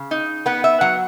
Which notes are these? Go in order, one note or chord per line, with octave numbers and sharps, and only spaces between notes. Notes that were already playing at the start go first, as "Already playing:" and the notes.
Already playing: C#3
D#4
B3 F#5
E5
F#3 F#5